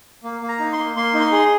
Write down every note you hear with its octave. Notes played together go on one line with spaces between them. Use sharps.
A#3
A#3
A#5
D#4
C6
A#3
A#3 C6
D#4
C6
G#4 C6